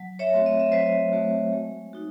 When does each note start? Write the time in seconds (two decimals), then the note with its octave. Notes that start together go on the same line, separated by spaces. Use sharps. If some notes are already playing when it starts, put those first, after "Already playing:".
Already playing: F#3
0.19 C#5 E5
0.33 A3 C4 F#4
0.46 D#5
0.60 E5
0.72 F#3 C5 D#5
1.13 A3 C4 F#4
1.53 G#3
1.93 D#4 F#4